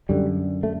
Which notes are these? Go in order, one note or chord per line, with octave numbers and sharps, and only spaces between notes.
F#2 D3 G3
A3